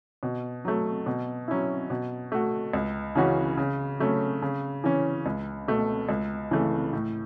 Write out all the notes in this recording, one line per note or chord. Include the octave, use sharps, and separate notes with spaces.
B2
F#3 A3
B2
F#3 C#4 E4
B2
A3 F#4
C#2
C#3 E3 C#4 F#4
C#3
F#3 A3 C#4
C#3
E3 C#4
C#2
B2 A3
C#2
C#3 E3 A3
A2